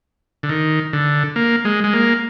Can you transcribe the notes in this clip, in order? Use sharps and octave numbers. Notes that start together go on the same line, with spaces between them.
D3
D#3
D3
A#3
G#3
G#3
A#3